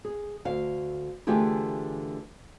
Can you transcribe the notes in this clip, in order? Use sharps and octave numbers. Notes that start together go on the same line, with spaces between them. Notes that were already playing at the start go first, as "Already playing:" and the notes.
G#4
D2 F5
D3 E3 A3 F4 G4 G#4